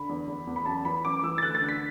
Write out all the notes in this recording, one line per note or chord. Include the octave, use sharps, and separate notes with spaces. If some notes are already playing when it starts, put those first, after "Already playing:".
Already playing: D3 B5
E2
E2
E2
B5
F#2 A5
E3 B5
F#2 D6
D6
E3 E6
A6
D2 F#6
A6
D3
B6